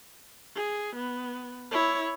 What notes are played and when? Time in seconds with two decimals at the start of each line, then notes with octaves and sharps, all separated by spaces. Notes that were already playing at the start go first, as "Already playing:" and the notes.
0.56 G#4
0.96 B3
1.71 E4 C#5